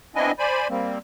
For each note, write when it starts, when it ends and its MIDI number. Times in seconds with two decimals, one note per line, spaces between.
0.15 0.32 59
0.15 0.32 60
0.15 0.32 62
0.15 0.32 64
0.15 0.32 75
0.15 0.32 80
0.39 0.68 72
0.39 0.68 74
0.39 0.68 80
0.39 0.68 83
0.70 0.98 55
0.70 0.98 58
0.70 0.98 60